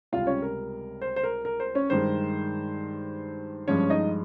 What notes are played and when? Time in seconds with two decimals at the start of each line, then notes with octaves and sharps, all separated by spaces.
0.12 C#2 C3 G3 F4 F5
0.27 C#4 C#5
0.42 A#4
1.02 C5
1.16 C5
1.23 A#4
1.45 A#4
1.60 C5
1.75 C#4 C#5
1.90 G2 D#3 G#3 C5
3.68 G2 F3 G#3 C#4 C#5
3.90 D#4 D#5